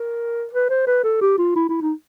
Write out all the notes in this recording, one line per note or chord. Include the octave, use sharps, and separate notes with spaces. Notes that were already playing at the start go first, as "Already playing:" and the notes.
Already playing: A#4
B4
C5
B4
A4
G4
F4
E4
E4
D#4